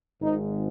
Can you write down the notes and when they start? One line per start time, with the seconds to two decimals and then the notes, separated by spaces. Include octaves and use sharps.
0.21 G#1 G#2 G#3 D#4